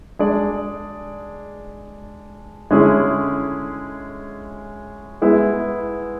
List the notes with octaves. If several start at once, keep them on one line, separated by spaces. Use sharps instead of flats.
G#3 D4 G#4 D5
D3 G#3 C#4 E4 G#4
G#3 B3 E4 G#4